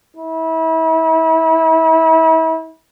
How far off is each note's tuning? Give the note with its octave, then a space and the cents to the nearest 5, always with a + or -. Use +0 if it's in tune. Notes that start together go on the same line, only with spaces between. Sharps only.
E4 -35